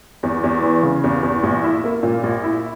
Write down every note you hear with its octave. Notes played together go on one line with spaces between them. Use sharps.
E2
E2
E3
C#3
E2
E2
A#1
E4
A#3
A#2
A#1
E4